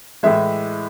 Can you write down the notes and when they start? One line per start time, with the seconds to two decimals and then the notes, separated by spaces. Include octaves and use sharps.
0.23 A2 E3 G#3 E5